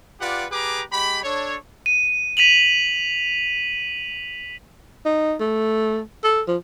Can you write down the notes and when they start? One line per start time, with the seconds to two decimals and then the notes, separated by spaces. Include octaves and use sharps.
0.21 F4 G4 B4 D5 F#5
0.51 G4 G#4 B4 A#5 D6
0.92 G#3 G4 B5
1.23 D4 A4 C#5
1.86 D#7
2.37 B6 D#7 F7 F#7
5.05 D#4
5.40 A3
6.24 A4
6.48 F3